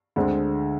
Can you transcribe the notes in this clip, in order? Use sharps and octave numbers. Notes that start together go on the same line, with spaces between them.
D2 D3 G#3 C4